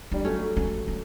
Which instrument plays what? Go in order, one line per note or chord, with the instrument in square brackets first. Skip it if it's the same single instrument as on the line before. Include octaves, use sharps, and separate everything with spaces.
[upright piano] G3 [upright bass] D4
[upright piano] F#3 A3 [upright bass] C#4
[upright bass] C#4
C#4